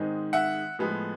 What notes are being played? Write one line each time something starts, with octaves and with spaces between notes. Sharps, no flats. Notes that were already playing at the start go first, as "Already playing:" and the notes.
Already playing: G#2 D#3 G#3 C4 D#4
E5 F#5
A2 F3 G#3 B3